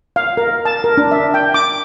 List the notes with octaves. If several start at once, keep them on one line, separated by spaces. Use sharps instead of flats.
F5
A#4
A5
A#4
D4
E5
G5
D6